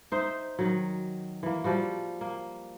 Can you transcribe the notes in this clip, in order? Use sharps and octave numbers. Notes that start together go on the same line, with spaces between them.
D#4 C5 E5
D#3 F#3
E3 A#3
F3 G3 F#4
A#3